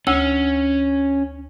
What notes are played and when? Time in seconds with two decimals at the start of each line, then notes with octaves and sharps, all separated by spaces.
0.07 D2 C#4 E6